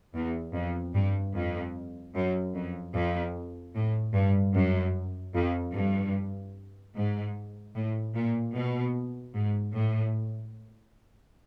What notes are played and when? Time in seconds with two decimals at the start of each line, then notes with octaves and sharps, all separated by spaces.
0.15 E2
0.54 F2
0.94 G2
1.34 F2
2.15 F#2
2.54 F2
2.94 F2
3.75 A2
4.14 G2
4.55 F#2
5.34 F2
5.74 G2
6.95 G#2
7.75 A2
8.15 A#2
8.55 B2
9.35 G#2
9.75 A2